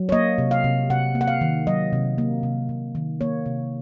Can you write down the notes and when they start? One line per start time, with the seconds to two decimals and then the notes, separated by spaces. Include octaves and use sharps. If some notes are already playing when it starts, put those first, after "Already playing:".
Already playing: F#3
0.09 C#5
0.12 A#3 D#5
0.38 C3
0.51 F5
0.64 C3
0.90 C3 F#5
1.15 A#3
1.21 F#5
1.28 F5
1.41 D#3
1.67 F#3 D#5
1.93 C3
2.18 A#3
2.43 C3
2.69 C3
2.95 D#3
3.21 A#3 C#5
3.46 C3